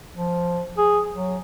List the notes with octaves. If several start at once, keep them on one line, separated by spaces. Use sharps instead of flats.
F3
G#4
F#3